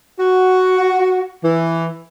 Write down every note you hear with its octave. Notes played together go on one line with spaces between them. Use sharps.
F#4
E3